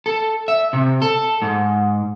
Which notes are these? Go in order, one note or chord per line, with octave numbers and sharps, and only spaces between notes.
A4
E5
C3
A4
G#2